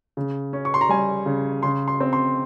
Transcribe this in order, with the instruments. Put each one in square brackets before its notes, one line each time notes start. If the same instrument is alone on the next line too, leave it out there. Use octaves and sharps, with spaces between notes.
[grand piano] C#3
C#4
C#6
C6
A#5
G3 G#5
C#3
C#3 C6
C6
C4
C6